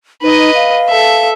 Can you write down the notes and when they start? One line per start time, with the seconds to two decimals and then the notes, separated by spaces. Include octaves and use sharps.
0.23 D#4 B4 D#5
0.55 F5
0.89 A4 E5